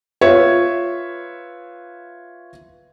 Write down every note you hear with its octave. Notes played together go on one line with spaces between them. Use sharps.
F4 B4 C#5 E5